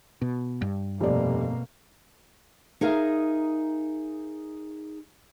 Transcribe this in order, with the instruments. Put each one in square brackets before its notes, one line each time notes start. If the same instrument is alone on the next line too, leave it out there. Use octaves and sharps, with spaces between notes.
[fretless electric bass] B2
G2
[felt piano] F1 D5 [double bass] B2 A#3
[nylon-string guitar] D#4 G#4 A#4 E5 F5